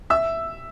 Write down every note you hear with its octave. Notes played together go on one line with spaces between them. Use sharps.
E5 E6